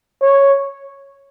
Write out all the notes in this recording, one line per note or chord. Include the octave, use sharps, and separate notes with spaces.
C#5